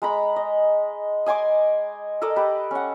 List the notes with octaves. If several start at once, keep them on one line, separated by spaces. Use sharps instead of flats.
G#3 A#5 B5
D#5
D#5 G#5 C6 D6
A4 A#4 D5 D#5
G4 B4
C#4 F#5